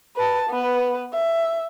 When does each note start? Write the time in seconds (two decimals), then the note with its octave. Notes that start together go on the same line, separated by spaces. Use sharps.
0.16 B4 A5
0.50 B3 B4
1.13 E5